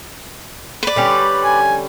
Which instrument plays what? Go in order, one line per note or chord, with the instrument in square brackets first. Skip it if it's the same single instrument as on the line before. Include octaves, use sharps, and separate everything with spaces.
[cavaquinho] B4 D5
[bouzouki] D3 G3 C#4
[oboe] G#5